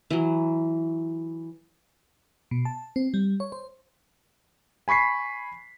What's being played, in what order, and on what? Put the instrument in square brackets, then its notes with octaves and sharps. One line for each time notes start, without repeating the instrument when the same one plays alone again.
[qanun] E3 F#3
[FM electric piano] B2
A5
C4
G3
C#5
C5
[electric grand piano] G#5 B5 C#6 B6 C7